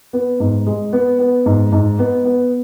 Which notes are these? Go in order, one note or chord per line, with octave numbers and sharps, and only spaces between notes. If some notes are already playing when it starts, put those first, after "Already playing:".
B3
G#2
G#3
B3
B3
G#2
G#2
B3
B3